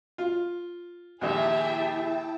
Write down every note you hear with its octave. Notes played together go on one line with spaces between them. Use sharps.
F4
A#1 D#2 E4 G4 G#4 E5 G5 A5